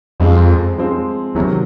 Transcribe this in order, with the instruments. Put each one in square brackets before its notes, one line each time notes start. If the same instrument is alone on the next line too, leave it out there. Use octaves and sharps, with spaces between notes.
[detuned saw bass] F2 [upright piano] F3 G#3 C4
[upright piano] F3 G#3 C4
[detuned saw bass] E2 [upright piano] C3 D#3 F#3